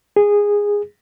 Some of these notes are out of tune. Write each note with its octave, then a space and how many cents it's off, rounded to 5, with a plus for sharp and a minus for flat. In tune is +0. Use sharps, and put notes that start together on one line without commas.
G#4 -15